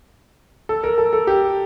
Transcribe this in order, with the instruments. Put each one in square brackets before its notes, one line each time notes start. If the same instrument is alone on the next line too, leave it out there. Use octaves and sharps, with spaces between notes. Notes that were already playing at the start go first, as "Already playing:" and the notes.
[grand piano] A4
A#4
A4
A4
G4